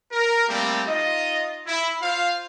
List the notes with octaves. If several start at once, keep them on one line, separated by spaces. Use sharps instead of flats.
A#4
G3 A3 A#3 C4 G4
D#4 F4 D#5
E4
F4 C5 F5